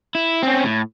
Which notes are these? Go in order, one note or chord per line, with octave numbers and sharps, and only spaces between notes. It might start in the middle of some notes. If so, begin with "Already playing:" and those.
E4
C4 C#4
A2